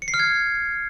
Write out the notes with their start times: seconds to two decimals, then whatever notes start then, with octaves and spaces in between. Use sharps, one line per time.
0.02 C#7
0.08 C7
0.14 F6
0.19 G#6